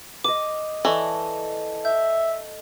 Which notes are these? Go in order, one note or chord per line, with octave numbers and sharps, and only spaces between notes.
D#5 D6 D#6
E3 A4 D5 D#5 C#6
E5 G6